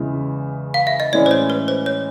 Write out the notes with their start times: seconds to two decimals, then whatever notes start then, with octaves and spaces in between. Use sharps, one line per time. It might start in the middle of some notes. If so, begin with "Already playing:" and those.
Already playing: E2 C#3 E3 G#3
0.74 F5
0.87 E5
1.00 D#5
1.13 A2 E3 G#3 C#4 E4 D5
1.26 C5
1.31 C#5
1.50 B4
1.68 C5
1.86 C#5